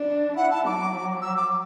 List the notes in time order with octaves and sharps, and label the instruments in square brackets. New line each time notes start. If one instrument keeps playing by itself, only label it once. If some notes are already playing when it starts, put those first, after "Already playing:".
Already playing: [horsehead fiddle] D4
[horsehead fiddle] E4 [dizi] F#5
[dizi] A5
[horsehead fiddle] F#3 [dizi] D6
[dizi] E6
D6